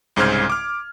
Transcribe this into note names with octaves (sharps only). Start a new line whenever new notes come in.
C2 G#2 C#3 C5 F6 G#6
D6 F6